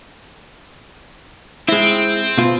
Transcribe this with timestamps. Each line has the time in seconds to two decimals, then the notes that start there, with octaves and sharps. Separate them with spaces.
1.69 G#3 C4 E4
2.38 B2 F4